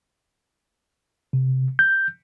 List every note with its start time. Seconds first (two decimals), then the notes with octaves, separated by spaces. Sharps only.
1.33 C3
1.79 G6